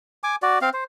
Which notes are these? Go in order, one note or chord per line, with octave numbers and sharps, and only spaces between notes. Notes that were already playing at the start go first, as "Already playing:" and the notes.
G#5 D6
F#4 D5
C4 F5
C5